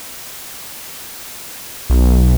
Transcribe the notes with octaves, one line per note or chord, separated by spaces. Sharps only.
B1